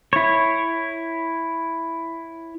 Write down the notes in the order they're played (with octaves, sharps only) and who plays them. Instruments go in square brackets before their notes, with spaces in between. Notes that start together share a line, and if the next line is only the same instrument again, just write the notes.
[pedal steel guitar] E4 C#5